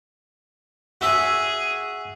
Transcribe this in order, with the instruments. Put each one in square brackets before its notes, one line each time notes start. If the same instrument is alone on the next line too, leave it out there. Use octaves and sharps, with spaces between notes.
[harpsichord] F#4 E5 [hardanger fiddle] G#4